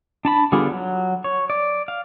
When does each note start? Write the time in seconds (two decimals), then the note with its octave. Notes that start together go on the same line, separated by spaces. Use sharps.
0.25 D4 A5 B5
0.52 D3 G3 B3 F4 G#4
0.71 F#3
1.24 C#5
1.50 D5
1.88 F5